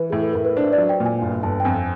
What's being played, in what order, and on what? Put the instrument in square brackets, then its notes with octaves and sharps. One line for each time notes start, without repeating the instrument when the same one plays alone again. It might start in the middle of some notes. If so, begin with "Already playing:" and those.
Already playing: [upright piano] E3 [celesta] B4
[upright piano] A2 [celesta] G#4
[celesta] A4
[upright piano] A2 [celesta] A#4
[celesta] B4
[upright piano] D4 [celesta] C5
[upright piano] F#3 [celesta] D5
[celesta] G5
[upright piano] A#2
[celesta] G#5
[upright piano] G1
[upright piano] G1 [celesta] A5
[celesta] G5
[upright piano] F2 [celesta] G#5